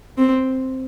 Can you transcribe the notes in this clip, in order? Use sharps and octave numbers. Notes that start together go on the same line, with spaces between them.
C4